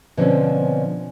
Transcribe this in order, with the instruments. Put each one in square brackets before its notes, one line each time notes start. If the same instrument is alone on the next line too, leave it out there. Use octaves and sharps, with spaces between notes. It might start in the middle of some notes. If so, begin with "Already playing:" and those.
[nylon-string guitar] B2 D3 F3 A#3 C4 C#4